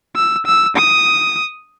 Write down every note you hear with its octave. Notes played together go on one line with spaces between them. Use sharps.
E6
E6
D#6